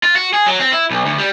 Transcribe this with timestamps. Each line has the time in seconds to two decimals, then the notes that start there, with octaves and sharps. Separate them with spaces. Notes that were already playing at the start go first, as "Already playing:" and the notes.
0.03 F4
0.16 F#4
0.34 G#4
0.46 F#3
0.60 C4
0.72 E4
0.90 B1
1.06 D2
1.18 G3